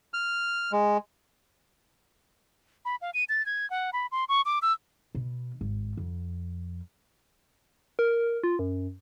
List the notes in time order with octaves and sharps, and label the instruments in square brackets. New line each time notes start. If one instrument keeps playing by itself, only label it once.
[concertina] F6
G#3
[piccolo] B5
F5
D#7
A6
G#6
F#5
B5
C6
C#6
D6
E6
[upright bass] B2
G#1
F2
[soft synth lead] A#4
F4
F#2